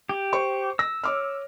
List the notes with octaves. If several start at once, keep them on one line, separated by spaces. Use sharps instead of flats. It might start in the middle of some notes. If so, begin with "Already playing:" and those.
G4
C5 C#6
E6 A#6
C#5 D6 F6